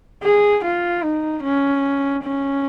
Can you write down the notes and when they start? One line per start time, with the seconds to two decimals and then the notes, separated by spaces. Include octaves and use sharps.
0.23 G#4
0.64 F4
1.03 D#4
1.44 C#4
2.24 C#4